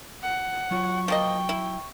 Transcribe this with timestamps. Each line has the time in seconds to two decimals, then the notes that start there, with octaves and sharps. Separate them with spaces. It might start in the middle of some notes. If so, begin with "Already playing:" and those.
0.22 F#5
0.71 F#3 F4 C#5 C#6
1.08 F3 A#3 D#5 G5
1.49 E4